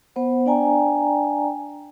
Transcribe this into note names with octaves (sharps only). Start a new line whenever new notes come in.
B3 C5 F#5
D4 D5 G5 G#5 A#5